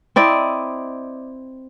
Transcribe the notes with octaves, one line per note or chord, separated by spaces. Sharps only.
C4 E4 D5 D#5